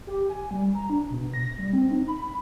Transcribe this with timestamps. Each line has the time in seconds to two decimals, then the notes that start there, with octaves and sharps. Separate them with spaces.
0.07 G4
0.30 G#5
0.51 G3
0.75 A#5
0.90 D4
1.10 B2
1.34 A#6
1.58 G3
1.73 C4
1.91 D#4
2.08 B5
2.20 B5